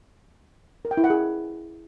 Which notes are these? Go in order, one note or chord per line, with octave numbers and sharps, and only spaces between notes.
A#4
G5
E4
F#5
G#4